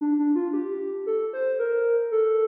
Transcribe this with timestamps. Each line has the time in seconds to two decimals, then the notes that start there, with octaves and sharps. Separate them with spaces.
0.01 D4
0.19 D4
0.36 F4
0.53 G4
1.06 A4
1.33 C5
1.59 A#4
2.11 A4